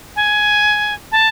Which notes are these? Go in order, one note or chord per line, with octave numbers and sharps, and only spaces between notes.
G#5
A5